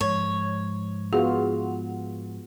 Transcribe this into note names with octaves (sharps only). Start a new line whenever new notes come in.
G#2 F3 C#5
B3 F4 F#4 G#4